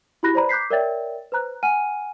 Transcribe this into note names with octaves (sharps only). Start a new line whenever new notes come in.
E4 F#4 G4 B5 F#6 A#6
B4 C5 D5 A#5 B5
D6 F#6 G6 B6 C7
A#4 C#5 D5 E5 G5 A6
B4 C5 A#5 F#6
F#5 G#5 F6 D#7